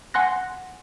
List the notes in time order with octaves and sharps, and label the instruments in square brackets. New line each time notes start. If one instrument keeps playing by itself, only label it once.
[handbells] F#5 G#5 C6 F#6 A#6